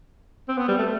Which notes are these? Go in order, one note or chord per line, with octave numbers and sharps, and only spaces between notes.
C4
B3
G3
A3